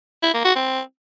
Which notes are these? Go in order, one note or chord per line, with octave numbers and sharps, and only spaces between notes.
E4
A#3
F#4
C4